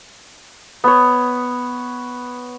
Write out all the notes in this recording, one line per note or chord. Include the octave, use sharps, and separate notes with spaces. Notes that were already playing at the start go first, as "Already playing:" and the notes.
B3 C#5